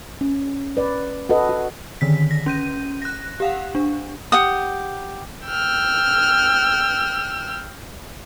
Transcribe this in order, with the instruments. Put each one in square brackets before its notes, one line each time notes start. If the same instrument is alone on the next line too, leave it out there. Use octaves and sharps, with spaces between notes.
[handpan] C#4
B4 D5
F#4 A4 B4 D#5
F#4
[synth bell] D3 D#3 B6
A#6
C#4 G6 D#7
F#6 A#6
G4 F5 F#5
D4
[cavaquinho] G4 F#5 D#6
[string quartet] G5 E6 F6